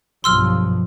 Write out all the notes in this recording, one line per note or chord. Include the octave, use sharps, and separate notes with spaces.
B1 G2 F3 C6 E6 F6